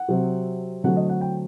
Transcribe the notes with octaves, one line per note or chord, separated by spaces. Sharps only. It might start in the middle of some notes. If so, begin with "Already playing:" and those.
Already playing: F#5
C3 F#3 C4
D3 F#3 A3 C4 F#5
D#5
F#5
G5